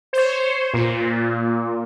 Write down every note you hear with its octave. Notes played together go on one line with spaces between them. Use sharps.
C5 C#5
A#2